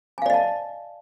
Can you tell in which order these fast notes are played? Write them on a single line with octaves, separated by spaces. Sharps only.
G#5 F5 D5 D#5 A5